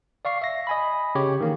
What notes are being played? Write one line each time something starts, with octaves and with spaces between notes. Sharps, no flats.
D5 F5 C#6 C7
E5 A#6
D#5 G#5 B5
C#3 G4 C#5
D#3 E3 A#3